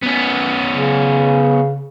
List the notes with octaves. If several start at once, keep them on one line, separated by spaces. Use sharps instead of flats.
B3 C#4
C#3